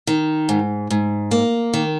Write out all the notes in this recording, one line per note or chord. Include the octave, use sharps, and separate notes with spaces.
D#3
G#2
G#2
A#3
D#3